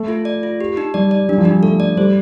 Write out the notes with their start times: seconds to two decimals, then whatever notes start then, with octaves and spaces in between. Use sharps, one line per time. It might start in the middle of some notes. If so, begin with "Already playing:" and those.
Already playing: A3
0.08 F4
0.25 D5
0.43 F4
0.60 G4
0.77 D#4
0.94 G3 D5
1.11 D5
1.29 G3 D4
1.38 F3
1.45 G3 D4
1.62 A3 A4
1.80 D5
1.97 G3 C5